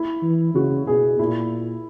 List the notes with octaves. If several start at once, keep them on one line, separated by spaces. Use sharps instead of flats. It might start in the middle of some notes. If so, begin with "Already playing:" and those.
Already playing: E4
E3
C#3 F#4
B2 G#4
A#2 E4